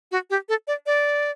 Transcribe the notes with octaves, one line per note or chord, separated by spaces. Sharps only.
F#4
G4
A4
D5
D5